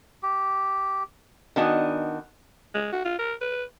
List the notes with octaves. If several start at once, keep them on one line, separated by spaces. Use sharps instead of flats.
G4
D#3 B3 D4 F#4 D#5 G#5
G#3
F#4
F4
A#4
B4